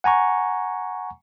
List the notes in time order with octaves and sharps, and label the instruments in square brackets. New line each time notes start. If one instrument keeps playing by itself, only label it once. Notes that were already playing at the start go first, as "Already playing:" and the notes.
[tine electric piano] F#5 G#5 A#5 C#6